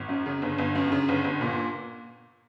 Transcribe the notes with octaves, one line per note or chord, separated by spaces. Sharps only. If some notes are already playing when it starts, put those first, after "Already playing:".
Already playing: G#1
F#2
C#3
G1
G1
F#2
C#3
G1
G1
A#2